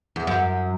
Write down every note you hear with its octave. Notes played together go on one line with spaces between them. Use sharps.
E2
F#2